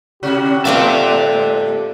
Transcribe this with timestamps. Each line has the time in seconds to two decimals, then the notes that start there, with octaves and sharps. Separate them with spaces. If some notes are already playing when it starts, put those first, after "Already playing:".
0.23 A2 C3 F#4 G4
0.65 A2 G#3 C4 F4 A4 D5 E5